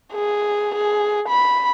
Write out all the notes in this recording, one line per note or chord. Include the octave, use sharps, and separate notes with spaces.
G#4
G#4
B5